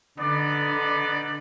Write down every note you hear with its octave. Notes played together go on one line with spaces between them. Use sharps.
D3 B3 D#4 D5